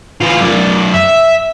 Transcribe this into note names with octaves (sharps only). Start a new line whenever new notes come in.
E3 F4
F#2 D5
E5